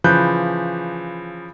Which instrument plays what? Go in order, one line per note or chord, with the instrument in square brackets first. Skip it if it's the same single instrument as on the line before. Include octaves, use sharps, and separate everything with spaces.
[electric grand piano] C#3 E3 F3 B5 F#6 G6